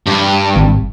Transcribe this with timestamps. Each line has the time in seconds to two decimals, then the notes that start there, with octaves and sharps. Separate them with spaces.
0.07 G2
0.56 G#1